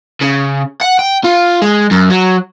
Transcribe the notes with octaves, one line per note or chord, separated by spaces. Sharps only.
C#3
F#5
G5
F4
G#3
F#2
F#3